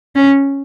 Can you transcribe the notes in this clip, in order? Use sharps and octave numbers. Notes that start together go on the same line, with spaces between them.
C#4